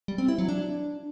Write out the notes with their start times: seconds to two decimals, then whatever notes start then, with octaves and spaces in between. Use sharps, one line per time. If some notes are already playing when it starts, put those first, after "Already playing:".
0.08 G3
0.18 C4
0.28 E4
0.38 F#3
0.49 D4